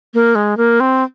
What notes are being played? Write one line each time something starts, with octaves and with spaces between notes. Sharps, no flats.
A#3
G#3
A#3
C4